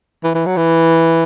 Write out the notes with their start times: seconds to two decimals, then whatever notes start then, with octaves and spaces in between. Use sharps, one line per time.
0.24 E3
0.35 E3
0.46 F#3
0.57 E3